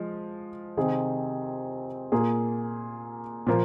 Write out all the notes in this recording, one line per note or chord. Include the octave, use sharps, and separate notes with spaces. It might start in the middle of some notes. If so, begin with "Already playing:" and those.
Already playing: F3 G#3
C3 D#3 C4 G#4
A#2 A#3 G#4
A#2 F3 A#3